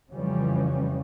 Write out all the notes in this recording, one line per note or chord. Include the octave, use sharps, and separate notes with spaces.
F2 C#3 E3 F3 G3 C#4